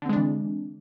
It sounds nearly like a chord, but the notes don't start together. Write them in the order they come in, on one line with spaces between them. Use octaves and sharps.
D3 C4 G#3 D4 E3